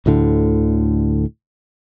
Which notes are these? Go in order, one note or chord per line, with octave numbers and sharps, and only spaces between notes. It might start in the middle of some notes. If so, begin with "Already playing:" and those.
D2 A2 D3